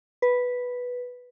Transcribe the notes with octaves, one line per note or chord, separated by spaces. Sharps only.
B4